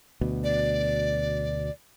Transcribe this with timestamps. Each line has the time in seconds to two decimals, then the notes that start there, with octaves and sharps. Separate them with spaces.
0.21 D2 B2
0.44 D5